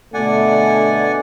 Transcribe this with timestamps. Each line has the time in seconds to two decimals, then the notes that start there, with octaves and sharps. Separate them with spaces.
0.14 B2 D3 A3 D5 F#5 G#5